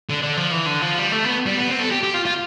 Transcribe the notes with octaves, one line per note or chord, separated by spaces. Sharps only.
D3
D3
F3
E3
D3
F3
G3
A3
B3
G3
B3
C4
A4
G4
G4
F4
F4